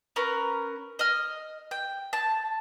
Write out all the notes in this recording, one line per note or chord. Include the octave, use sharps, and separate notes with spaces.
C#4 A#4 B4
D#5 F6
G5
A5